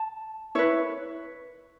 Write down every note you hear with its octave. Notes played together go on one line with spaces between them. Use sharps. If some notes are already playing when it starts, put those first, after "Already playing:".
Already playing: A5
E4 B4 C#5